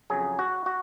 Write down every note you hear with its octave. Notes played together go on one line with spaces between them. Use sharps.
F2 C#3 F#3 G#4
F#4
F#4